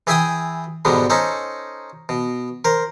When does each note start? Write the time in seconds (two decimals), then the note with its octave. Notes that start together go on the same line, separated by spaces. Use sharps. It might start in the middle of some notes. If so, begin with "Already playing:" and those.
0.07 E3 G#4 E5 G5 G#5 D#6
0.85 G#2 B2 D3 G3 B3
1.10 C#4 D#4 A4 C5
2.09 B2
2.65 A#4 C5